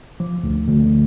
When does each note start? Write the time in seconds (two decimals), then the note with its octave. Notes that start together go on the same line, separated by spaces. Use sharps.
0.20 F3
0.43 D2
0.67 D2